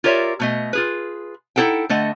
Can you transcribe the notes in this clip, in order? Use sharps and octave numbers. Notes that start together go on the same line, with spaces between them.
F4 G4 A#4 C#5 D5 E5
B2 A3 D#5
F4 G#4 B4
D#4 E4 G#4 A4 F#5 G5
D3 A3 D#5 F#5